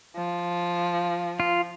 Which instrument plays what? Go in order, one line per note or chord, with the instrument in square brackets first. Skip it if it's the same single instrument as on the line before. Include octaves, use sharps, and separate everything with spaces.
[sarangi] F3
[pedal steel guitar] F4